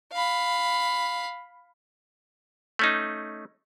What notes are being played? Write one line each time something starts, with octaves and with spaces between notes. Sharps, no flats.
F5 B5
A3 C#4 D#4